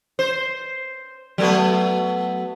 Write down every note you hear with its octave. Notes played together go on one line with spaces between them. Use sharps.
C5
F#3 A3 B3